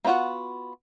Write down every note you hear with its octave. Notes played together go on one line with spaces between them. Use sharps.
A#3 B3 F4 F#4 F#5